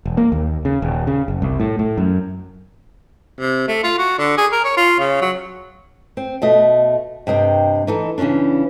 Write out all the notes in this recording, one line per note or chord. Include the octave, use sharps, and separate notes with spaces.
E1
A#3
D#2
C#3
D#1
C#3
F#1
C2
A2
A2
F#2
C3
A3
F4
F#4
D3
G#4
A#4
C#5
F4
C#3
F#3
C4
B2 A3 D#5
G2 C3 D#5 G5
E3 D#4 A4
C#3 E3 B3 C#4 D4